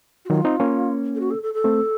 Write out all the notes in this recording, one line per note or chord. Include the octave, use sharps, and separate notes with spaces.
F#4
D#3 F#3 F4
C4 D#4
A#3 C#4
A4
F#4
A4
A4
A4
A3 C4